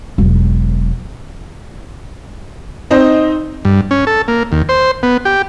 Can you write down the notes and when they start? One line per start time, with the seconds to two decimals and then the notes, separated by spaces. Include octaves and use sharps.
0.18 E1 F#3
2.91 C4 D#4 C5 D#5
3.65 G2
3.91 C#4
4.07 A4
4.28 A#3
4.52 D#2
4.69 C5
5.03 B3
5.25 G4